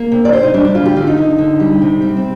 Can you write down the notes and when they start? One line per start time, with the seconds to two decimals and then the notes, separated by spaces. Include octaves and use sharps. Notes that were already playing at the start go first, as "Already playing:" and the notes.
Already playing: A#3
0.12 C3
0.25 D5
0.33 C3 C5
0.43 D#4
0.54 G3 D4
0.65 D4
0.75 D3 F4
0.86 G4
0.96 D3 F4
1.07 D#4
1.17 D3
1.38 D3
1.60 G3
1.82 C3
2.02 G3 C4
2.17 C4